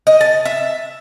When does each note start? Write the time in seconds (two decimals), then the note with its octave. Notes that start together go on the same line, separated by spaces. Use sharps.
0.07 D#5
0.21 A5
0.45 E5